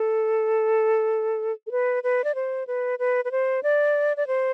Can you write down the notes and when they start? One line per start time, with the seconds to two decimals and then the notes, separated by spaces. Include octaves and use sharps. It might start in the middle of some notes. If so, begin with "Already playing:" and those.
Already playing: A4
1.67 A4
1.71 B4
2.03 B4
2.24 D5
2.35 C5
2.67 B4
2.99 B4
3.25 B4
3.31 C5
3.63 D5
4.17 D5
4.27 C5